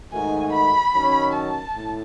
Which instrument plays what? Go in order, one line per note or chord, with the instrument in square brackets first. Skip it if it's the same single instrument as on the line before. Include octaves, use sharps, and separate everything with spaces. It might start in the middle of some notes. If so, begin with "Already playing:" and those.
[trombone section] G#2 D#3 A3 D#4 F#4 [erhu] G#5
[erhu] B5
[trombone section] D#3 F#3 C#4
[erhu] A5
[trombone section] A2